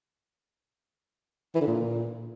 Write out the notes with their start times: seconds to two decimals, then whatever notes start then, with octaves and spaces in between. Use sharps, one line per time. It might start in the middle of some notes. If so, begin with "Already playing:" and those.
1.55 E3
1.61 D3
1.67 A#2